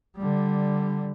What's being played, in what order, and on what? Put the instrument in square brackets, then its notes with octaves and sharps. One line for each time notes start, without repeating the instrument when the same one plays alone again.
[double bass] D3 G3